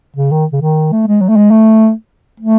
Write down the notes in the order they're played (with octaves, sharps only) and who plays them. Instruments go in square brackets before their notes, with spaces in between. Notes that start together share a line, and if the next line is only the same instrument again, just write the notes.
[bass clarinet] C#3
D#3
C#3
D#3
A3
G#3
F#3
A3
G#3
A3
A3